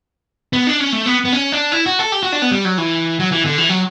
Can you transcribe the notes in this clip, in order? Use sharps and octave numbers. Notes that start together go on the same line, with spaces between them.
B3
D4
C#4
A3
B3
B3
C#4
D4
E4
F#4
A4
G4
F#4
D4
B3
G3
F#3
E3
F#3
E3
D3
E3
F#3